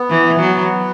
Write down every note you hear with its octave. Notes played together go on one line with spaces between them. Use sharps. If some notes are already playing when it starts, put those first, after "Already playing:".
Already playing: B3
E3
F#3